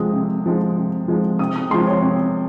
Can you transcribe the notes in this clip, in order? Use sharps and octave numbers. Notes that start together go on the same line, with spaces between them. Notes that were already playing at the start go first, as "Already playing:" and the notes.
Already playing: C3 F3 G#3 D#6
C3
F3 G#3
C3
F3 G#3
C3 D#6
D#6
F3 G#3 C6
C#5
C3